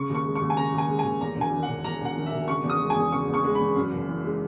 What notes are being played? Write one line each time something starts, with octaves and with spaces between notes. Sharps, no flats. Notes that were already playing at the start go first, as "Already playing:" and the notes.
Already playing: C#3 C#6
D#2
C#6
G#3
C#6
D#2
G#5
C#3 A#5
D#2
G#5
G#3
D#2 G#5
E2 A#5
E1
G#5
D#3
F#5
E1
E2 A#5
E1 F#5
D#3
E5
E1
C#3 C#6
E2
D#6
G#3
G#5
E2
C#3 C#6
E2
C#6
G#3
B5
E2
F#2
F#1
E3
G#3